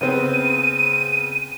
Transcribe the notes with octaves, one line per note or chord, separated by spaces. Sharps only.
C#3 B3 C4 D#7